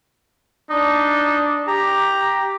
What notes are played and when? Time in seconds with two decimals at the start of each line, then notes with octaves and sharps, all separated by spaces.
0.70 D4 D#4
1.68 G4 A#5